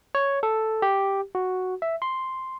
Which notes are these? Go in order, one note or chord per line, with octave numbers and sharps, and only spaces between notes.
C#5
A4
G4
F#4
E5
C6